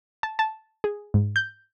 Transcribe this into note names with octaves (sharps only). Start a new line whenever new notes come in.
A5
A5
G#4
G#2
G6